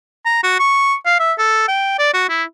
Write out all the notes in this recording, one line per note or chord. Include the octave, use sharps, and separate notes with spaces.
A#5
F#4
C#6
F5
E5
A4
G5
D5
F#4
E4